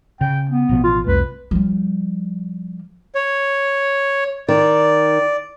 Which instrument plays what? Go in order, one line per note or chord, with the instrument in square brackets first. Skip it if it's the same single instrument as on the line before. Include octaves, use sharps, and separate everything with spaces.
[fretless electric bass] C#3 [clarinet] G5
[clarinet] B3
[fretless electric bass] A1 B2 F3
[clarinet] F4
[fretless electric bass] C2 F2 A3 [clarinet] B4
[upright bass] F3 G3
[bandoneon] C#5
[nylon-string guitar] D#3 [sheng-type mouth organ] D5